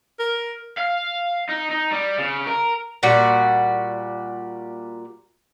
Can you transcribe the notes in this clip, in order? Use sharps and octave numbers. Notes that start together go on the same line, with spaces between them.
A#4
F5
D#4
D#4
G3
C#3
A#4
A#2 G3 F#4